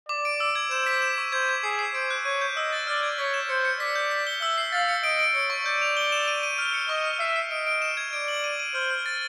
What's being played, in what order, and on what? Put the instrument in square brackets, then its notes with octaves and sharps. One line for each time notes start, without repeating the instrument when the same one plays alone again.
[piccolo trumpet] D5 [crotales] D6
[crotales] D7
E6
G#6
[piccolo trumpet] C5 [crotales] E7
[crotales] B6
E7
C#6
[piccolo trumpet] C5 [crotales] G#6
[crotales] G#6
[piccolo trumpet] G#4 [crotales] C7
[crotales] C7
[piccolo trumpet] C5 [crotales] D7
[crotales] F#6
[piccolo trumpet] C#5 [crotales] D#7
[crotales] G6
[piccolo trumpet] D#5 [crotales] E6
[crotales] A6
[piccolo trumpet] D5 [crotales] F6
[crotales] G#6
[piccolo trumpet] C#5 [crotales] B6
[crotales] E7
[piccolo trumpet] C5 [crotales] C#7
[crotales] C#7
[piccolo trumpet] D5 [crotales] B6
[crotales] G6
B6
G7
[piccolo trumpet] E5 [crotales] E6
[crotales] C7
[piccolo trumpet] F5 [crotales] A6
[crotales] C#7
[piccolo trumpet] D#5 [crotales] D7
[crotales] D7
[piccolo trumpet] C#5 [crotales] C#7
[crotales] C#6
[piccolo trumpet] D5 [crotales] G6
[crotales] F7
G7
E7
D#7
D#7
F6
C#7
[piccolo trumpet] D#5 [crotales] C#6
[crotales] F6
[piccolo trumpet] E5 [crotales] C7
[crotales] C7
[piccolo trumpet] D#5 [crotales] D7
[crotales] D7
E7
G#6
[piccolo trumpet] D5 [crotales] D7
[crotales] F#7
D#7
D#7
[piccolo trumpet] C5 [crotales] F6
[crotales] F6
A6